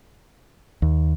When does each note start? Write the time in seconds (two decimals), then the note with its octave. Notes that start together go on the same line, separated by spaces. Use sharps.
0.82 D#2